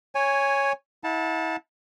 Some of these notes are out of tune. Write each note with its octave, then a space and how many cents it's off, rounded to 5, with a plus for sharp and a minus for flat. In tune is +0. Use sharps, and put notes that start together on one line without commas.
C#5 +0 G#5 -10
E4 -30 F#5 -40 A5 +0